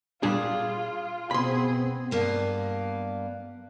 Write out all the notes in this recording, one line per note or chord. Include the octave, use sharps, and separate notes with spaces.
A#2 G3 D4 F4 G#4
B2 B3 C4 G#4 B5 C6
G2 A#3 B3